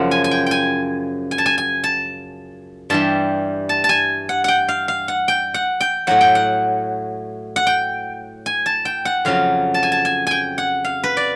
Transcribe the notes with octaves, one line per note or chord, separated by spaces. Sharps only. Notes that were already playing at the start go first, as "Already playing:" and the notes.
Already playing: F#2 C#3 F3 F#5
G#5
G#5
G5
G5 G#5
G#5
A5
G#5
G#5
A5
G2 E3 G3 A5
A5
A5
G#5
F#5
F#5 G5
F5
F5
F#5
G5
F#5
G5
A2 F#3 F#5
G5
F#5
F#5
G5
G#5
A5
G5
F#5
F2 C#3 F#3 F5
A5
G#5
A5
G#5
G5 G#5
F#5
F5
B4
D5